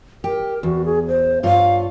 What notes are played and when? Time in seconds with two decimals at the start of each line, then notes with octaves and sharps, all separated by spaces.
0.24 G4 A#4
0.63 E2 F#4
0.85 G#4
1.08 C5
1.43 G2 F4 C#5 F5